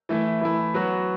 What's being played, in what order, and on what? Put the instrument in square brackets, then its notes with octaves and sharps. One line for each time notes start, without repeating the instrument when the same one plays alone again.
[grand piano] E3 A3 E4
E3 A3 E4
F#3 B3 F#4